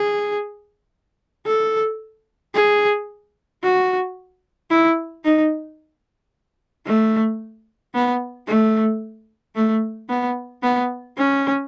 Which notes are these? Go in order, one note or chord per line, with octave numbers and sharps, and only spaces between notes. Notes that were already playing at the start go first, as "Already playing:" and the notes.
Already playing: G#4
A4
G#4
F#4
E4
D#4
A3
B3
A3
A3
B3
B3
C#4